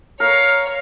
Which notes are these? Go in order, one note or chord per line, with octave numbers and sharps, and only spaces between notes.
A#4 C#5 F5